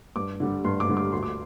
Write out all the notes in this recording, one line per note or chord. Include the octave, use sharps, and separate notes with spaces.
G2 D6
D3 G3
G2 C6
D6
D3 G3
D6
D2 C6
D6